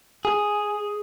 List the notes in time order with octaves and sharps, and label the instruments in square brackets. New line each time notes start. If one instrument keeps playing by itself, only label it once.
[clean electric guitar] G#4